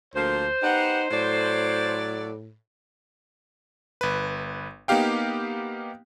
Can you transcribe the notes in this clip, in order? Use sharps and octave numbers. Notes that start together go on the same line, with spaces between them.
D2 F3 A#3 C5
B3 D#4 G4 F#5
A2 F#3 A4 D5
G1 B4
A#3 B3 D#4 G4 F5 G5